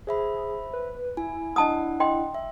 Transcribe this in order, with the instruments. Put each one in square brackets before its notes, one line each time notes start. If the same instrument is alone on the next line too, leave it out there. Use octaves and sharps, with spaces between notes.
[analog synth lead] G#4 [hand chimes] C5 E5 B5
[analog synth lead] B4
[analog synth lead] E4 [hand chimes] G#5
[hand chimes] D4 F#5 [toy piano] D#5 A5 D#6
[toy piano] D#5 G5 C6
[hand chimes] E5